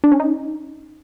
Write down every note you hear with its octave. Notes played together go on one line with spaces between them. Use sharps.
D4
C#4
D#4